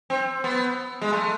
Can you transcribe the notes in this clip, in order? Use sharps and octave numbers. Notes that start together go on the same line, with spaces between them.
C4
B3
G#3
A3